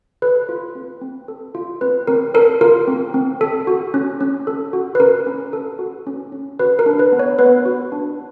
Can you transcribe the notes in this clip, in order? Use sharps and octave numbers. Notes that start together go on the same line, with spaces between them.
A4 B4
F4
C4
C4
A4
F4
C4 B4
C4 A#4
A4 A#4
F4 A#4
C4
C4
A4
F#4
C#4
C#4
A4
F#4
B4
C#4 A#4
C#4
A4
F#4
C#4
C#4
F#4 B4
A#4
D4
B4
B3
C#5
B3 B4
F#4
D4